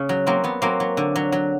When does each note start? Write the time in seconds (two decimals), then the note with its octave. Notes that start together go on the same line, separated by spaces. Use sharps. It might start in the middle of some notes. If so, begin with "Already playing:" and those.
Already playing: C#3 C#4
0.09 F#3
0.27 F#3 A#3 C4
0.44 F#3 B3
0.62 F#3 A#3 C4
0.80 F#3
0.97 D3
1.16 F#3
1.32 F#3